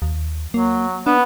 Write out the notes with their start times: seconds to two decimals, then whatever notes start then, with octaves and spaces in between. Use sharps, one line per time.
0.02 D#2
0.54 F#3 A#3
1.07 B3 D4